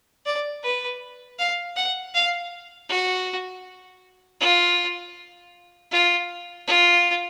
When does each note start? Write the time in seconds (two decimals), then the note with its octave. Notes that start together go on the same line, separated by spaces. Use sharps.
0.26 D5
0.63 B4
1.39 F5
1.76 F#5
2.14 F5
2.90 F#4
4.40 F4
5.92 F4
6.67 F4